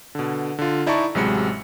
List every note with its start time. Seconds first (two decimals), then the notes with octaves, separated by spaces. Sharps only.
0.15 B2 D3
0.59 D3 F4
0.86 D#4 E4 D5 A5 A#5 C#6
1.15 A1 C3 F#3 G#3 B5 C#7